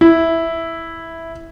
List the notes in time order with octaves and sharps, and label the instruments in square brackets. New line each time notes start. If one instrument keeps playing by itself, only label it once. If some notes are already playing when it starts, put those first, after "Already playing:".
[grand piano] E4